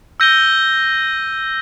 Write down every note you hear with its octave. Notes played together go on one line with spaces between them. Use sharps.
E6 G6 A#6 D#7 G7